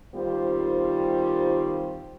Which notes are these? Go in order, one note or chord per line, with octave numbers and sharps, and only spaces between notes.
D#3 G3 C4 F4 C5